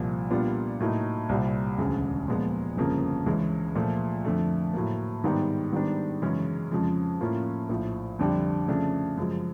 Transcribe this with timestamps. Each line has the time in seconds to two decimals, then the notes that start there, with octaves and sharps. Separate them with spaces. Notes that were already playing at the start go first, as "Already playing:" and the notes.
Already playing: C2 A#2 F3
0.30 A#2 G3 B3 D4 F4
0.80 A2 F#3 A#3 D#4
1.29 C2 A#2 G3 C4
1.78 E1 D2 C#3
2.28 A#2 F3 G#3 B3
2.77 G1 F2 C#3 F3 A#3
3.26 C#2 C#3 E3 G#3 C#4
3.75 A#2 F3 A3
4.25 F2 D3 F3 A3
4.74 A2 F#3 A#3
5.24 G#2 D#3 G3 B3
5.73 G#2 D#3 G3 B3 D4
6.22 F#2 C#3 E3 G#3 C#4
6.71 F2 C#3 F3 G#3
7.20 A2 F3 A#3 C#4 F4
7.69 A#1 A2 F3
8.19 F2 D3 G3
8.68 F2 C#3 F3 A3 D4
9.17 F#2 C#3 F3 G#3